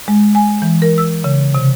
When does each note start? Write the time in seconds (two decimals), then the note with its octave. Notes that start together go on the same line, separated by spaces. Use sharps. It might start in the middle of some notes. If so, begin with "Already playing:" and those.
0.08 G#3
0.35 G#5
0.62 E3
0.82 A#4
0.98 E6
1.24 C#3
1.55 C3